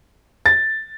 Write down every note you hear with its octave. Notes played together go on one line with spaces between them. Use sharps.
A6